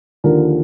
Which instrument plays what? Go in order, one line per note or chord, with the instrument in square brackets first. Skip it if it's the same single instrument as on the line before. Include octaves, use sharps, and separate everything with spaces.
[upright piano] D#2 D3 F3 A#4